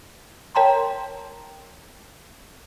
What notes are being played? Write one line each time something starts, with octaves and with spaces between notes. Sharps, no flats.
A#4 C#5 G5 A5 A#5 C6